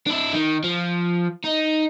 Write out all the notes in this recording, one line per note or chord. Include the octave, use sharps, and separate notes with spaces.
D4 E4
D#3
F3
D#4